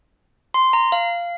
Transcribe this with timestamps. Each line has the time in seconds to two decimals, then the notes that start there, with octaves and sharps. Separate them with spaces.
0.54 C6
0.73 A#5
0.92 F5